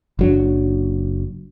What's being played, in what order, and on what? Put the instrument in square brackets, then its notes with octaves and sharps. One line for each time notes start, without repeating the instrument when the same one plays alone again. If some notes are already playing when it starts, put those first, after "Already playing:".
[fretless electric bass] F#1 F#3 D4